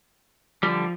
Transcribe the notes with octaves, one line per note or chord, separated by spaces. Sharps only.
D3 F3 G3